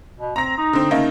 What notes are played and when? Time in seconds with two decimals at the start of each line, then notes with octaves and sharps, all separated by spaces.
0.20 B2
0.36 C4 A#5 A#6
0.58 D#4
0.73 D3 C4
0.91 C#3 A3 A#3 D#4